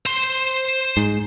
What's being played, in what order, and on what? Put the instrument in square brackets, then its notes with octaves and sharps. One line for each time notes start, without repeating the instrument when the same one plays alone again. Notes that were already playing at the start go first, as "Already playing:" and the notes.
[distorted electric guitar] C5 C6
[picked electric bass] G#2